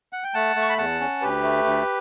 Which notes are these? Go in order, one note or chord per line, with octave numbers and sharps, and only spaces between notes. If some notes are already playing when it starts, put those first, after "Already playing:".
F#5
G5
A3 F#5 A5
A3
C#6
B5
E2 F#5 A5
C#4
D2 G4 B4
A3
D2